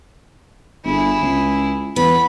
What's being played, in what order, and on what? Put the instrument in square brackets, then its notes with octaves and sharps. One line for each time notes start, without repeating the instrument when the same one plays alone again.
[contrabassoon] G1 [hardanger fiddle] E4 G#4
[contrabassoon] C#2
[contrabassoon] E2 [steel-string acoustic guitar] B3 [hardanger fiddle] B5